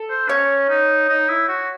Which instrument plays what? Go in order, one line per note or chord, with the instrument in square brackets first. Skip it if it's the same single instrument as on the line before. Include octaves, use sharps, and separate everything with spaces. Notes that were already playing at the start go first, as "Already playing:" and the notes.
Already playing: [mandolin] A4
[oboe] C5
[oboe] C#4 [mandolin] C#5
[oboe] D#4
D#4
E4
F#4